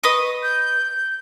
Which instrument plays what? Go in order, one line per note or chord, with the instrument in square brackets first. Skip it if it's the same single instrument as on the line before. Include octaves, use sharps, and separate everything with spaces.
[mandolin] B4 D#5 D#6 [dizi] C#6
[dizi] G6